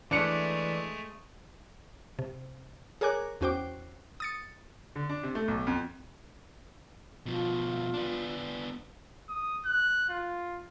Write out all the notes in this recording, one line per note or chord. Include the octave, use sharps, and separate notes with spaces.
E3 G#3 A3 D4 C#7
C3
G#4 A#4 C#5 G#5 D6 F#6
E2 C#4 F#4 C5 G5 D6
D#6 A6 C#7
D3
D4
C3
A3
B1
F2
B2 F3 F4
B3 D4
D#6
F#6
F4